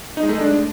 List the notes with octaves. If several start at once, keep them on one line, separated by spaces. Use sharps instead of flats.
D#4
G#3
A3
G#3
D4